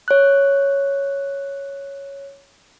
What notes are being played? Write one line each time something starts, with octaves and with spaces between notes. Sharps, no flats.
C#5 F#6